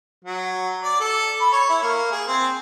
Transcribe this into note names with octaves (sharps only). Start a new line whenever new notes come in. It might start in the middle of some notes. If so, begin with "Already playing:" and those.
F#3
D5
A4
B5
C#5
E4
A#3
G#4
C4